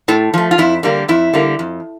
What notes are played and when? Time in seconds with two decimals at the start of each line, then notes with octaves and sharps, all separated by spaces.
0.08 A2 A4
0.34 F3 A3
0.51 F4
0.58 F2 E4
0.83 D3 G3 A#3
1.08 F2 E4
1.33 D3 G3 A#3
1.59 F2